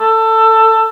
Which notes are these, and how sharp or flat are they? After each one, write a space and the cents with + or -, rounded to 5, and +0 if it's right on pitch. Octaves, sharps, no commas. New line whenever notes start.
A4 +20